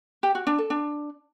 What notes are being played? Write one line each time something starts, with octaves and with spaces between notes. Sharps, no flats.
G4
F#4
D4
A4
D4